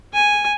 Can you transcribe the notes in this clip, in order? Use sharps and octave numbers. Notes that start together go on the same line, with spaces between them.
G#5